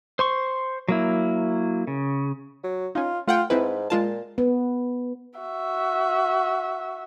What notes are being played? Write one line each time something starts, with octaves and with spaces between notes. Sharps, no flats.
C5 C6 C#6
F#3 A#3 E4
C#3
F#3
C#4 D#4 F4
A3 F4 F#5 G5
G#2 C4 E4 B4
A#2 G#3 F4 A5
B3
F#4 E5